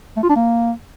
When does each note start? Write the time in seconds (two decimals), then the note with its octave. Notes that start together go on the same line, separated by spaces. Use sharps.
0.17 A3
0.23 F4
0.29 D4
0.36 A#3